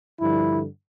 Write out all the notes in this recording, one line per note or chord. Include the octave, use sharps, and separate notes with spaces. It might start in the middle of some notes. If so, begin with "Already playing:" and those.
G2 D3 F3 E4